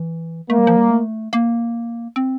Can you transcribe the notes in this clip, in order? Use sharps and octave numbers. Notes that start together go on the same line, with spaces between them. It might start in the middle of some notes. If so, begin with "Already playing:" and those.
Already playing: E3
A3 A#3
G3
F3
G3
A3
A#3
C4